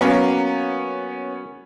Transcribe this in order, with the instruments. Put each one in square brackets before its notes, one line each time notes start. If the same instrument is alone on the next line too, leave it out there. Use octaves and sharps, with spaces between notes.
[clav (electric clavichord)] F#3 A#3 [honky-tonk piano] B3 C#4